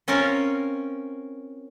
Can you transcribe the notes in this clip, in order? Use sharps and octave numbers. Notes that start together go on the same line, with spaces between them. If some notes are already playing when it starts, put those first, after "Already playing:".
C4 C#4 F4 A#4 C#5